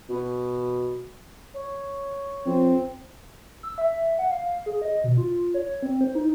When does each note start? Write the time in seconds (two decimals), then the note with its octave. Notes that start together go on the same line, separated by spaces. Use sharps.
0.09 B2
1.54 C#5
2.46 F2 C4
3.63 E6
3.78 E5
4.19 F#5
4.31 F5
4.66 G#4
4.82 D#5
5.04 B2
5.17 F4
5.54 C#5
5.83 C4
6.01 C5
6.15 D#4